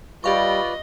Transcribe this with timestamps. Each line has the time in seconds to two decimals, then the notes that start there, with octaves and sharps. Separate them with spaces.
0.24 G3 F4 G4 B4 D5 D#5 F5 C#6